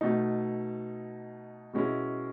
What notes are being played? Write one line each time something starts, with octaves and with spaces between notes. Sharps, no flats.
B2 A3 D#4
B2 G#3 C#4 E4